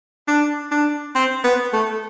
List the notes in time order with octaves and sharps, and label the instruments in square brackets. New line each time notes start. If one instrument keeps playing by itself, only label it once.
[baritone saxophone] D4
D4
C4
B3
A3